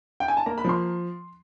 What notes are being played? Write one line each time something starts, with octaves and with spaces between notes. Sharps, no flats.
G5
G#5
A5
A#3 A#5
B5
F3 C6